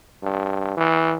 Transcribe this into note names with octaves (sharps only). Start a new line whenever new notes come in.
G2
E3